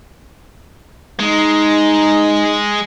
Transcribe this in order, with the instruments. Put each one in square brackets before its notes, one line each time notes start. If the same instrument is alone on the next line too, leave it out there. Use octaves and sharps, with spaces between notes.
[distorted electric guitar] G#3 [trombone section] D#4